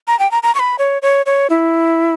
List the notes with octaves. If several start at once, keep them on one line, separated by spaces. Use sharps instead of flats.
A#5
G5
A#5
A#5
C#6
B5
C#5
C#5
C#5
E4